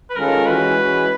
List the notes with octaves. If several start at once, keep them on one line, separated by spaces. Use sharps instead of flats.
B4
D#3 G#3 C#4 F4 A4 A#4
E3 G#3 C#4 F#4 B4
E3 G#3 C#4 F#4